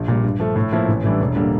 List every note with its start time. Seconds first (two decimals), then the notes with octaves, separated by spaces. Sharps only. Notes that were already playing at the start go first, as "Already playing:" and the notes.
Already playing: A#1
0.08 A#2 G3
0.24 G2
0.40 F3 A3
0.56 A2
0.72 F3 A#3 E4
0.88 A1
1.04 A2 E3 G3 D4
1.20 E1
1.36 D3 G3 A#3